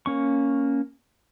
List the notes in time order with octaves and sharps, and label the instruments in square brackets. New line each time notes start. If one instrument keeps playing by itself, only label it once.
[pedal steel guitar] A#3 C#4 C#6